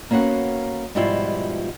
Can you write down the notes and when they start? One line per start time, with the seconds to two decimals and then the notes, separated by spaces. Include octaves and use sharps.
0.11 A#3 B3 C#4 F#4 F#5
0.95 G#2 B2 F3 G3 E4 F4